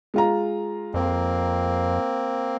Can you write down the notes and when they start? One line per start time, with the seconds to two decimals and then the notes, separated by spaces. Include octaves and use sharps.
0.14 G#3 F4 A#5
0.94 F2 A#3 C4